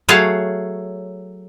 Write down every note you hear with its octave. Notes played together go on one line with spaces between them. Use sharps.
F#3 A3 G#4 C#5 F5 A5